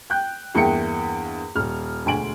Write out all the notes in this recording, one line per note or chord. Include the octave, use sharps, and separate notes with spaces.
G5 F#6 G6
E2 G2 A#3 E4 G5 C#7
D#1 F6
E1 D2 G#5 C6 D7 F#7